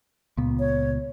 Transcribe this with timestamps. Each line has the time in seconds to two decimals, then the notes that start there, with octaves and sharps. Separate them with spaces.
0.37 C#2 A#2 B3
0.59 C#5